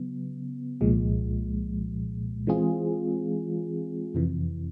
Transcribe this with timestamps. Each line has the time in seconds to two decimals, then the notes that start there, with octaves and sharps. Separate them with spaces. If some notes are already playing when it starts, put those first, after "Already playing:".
Already playing: C#3 F#3 B3
0.80 C2 A#2 F3 G#3
2.47 E3 G#3 C4 F4 G#4
4.15 F2 C3 E3